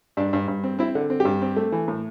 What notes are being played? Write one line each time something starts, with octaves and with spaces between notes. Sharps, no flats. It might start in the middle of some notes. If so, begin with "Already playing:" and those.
G2 D4
G2
G2
C4
C4 E4
D3
C4
G4
G2
C4
A3
E3
A2